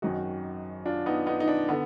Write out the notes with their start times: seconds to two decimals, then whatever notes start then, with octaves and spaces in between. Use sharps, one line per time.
0.02 G#1 F#2 D#3 D#4 F#4
0.85 D4 F4
1.06 B3 D#4
1.27 B3 D#4
1.40 D#4
1.48 D4
1.69 D3 B3